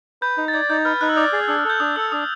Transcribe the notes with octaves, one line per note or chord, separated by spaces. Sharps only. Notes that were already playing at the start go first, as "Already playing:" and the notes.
B4 G6
D#4
A6
D5 G#6
D#4 G6
B4 F6
D#4 F#6
E6
D5 D#6
G#4
D4 E6
F6
A4 G6
D4 D#6
A4 E6
D4 D#6